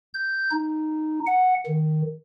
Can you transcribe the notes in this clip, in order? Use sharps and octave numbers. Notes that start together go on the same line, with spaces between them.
G6
D#4
F#5
D#3